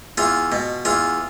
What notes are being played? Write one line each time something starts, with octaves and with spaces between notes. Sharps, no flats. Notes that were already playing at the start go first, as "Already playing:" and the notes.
E2 F4
B2
E2 F4